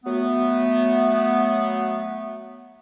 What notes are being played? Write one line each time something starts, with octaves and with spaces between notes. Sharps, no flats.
F#3 A3 B3